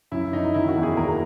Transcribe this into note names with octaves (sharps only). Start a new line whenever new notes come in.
F#2 E4
F#2 D#4
D#3 E4
F#4
E2
G#4
A#2 A#4